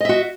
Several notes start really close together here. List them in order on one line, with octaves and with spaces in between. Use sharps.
D#5 E5 F#4